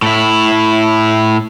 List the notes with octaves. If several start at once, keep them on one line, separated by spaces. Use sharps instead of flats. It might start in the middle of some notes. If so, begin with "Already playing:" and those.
A2 E4